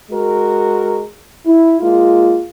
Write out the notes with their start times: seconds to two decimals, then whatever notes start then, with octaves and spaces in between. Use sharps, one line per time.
0.11 G#3 F#4 A#4
1.46 E4
1.81 G#3 A#3 F4